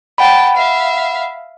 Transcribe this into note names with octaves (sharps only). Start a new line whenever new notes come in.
F#5 G5 A5 B5
E5 F5